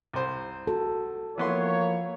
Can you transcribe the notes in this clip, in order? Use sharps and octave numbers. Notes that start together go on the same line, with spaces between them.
C2 C5
F#4 A4
E3 F3 A#3 B3 C#5 C6